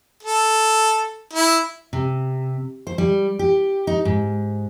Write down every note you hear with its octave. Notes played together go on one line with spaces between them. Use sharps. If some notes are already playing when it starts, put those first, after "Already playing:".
A4
E4
C3
C5
G3
G4
D#4
G#2